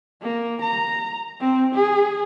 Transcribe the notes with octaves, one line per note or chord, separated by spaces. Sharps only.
A#3
A#5
C4
G#4